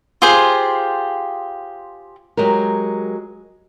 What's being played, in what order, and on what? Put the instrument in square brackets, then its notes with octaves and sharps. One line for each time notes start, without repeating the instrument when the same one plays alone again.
[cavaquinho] F4 G4 G#4 C5
[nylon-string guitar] F#3 G#3 G4 A#4